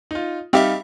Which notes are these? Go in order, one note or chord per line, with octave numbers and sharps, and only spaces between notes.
D#4 F4
G3 C4 D#4 G4 E5 F5